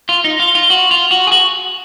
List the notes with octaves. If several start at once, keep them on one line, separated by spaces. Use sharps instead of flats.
F4
D#4
F4
F4
F#4
F4
F#4
G#4
F#4